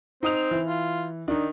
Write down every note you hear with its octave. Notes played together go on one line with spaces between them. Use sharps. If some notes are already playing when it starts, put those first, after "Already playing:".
C4 D#4 D#6 F7
E3
F4
D#3 D4 D#4